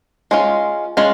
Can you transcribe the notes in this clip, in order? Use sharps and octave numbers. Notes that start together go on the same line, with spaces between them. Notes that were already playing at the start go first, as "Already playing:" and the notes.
G#3 C#4 F4
G#3 C#4 F4